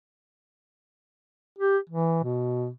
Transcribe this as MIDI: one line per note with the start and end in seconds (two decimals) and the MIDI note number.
1.58 1.78 67
1.90 2.23 52
2.24 2.69 47